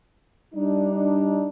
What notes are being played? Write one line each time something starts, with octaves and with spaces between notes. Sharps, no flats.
G3 D4 D#4